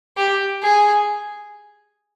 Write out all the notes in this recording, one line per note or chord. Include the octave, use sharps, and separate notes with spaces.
G4
G#4